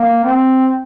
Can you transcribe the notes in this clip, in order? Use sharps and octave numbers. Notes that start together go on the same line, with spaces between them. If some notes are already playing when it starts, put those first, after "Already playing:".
Already playing: A#3
C4